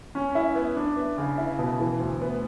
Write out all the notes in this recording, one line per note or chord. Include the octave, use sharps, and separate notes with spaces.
C#4
E4
B3
D4
B3
C#3
E4
B2
E3
D2
B3